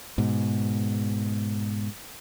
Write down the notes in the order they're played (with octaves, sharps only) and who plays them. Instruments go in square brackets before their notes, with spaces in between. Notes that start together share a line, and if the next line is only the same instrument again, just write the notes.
[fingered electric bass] G#2 B2